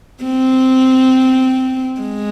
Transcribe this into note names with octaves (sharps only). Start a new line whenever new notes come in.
C4
G#3